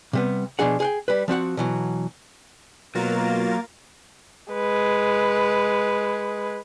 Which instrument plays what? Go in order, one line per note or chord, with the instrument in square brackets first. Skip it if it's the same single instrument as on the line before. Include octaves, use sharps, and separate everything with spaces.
[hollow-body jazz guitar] C3 G3 B3
B2 F3 D4 G#4 F#5
G#4 F#5 G5
G3 B4
F3 C4 F#4 F#5
B2 E3 F#3
[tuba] B2 [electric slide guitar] F#3 [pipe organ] A#3 [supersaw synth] F4 A#4 A6
[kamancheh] G#3 B4